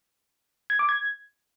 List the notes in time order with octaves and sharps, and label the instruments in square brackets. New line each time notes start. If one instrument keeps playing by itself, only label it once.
[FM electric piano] G#6
D6
G#6